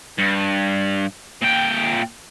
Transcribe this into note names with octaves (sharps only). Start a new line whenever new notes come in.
G2
A#2 G5